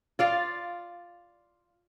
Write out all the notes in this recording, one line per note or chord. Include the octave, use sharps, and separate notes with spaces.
F4 D5 F5